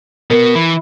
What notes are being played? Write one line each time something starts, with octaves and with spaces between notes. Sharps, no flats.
B2 B3 A#4
E3 B5